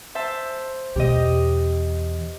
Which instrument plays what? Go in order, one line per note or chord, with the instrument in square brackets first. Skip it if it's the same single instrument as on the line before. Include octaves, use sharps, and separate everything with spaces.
[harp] C5 E5 A5
[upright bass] E2 B2 [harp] G4 D#5